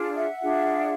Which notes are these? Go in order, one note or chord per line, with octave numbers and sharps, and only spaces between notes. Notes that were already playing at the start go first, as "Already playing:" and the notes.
Already playing: D4 F4 G#4
E5 F#5
D4 F4 G#4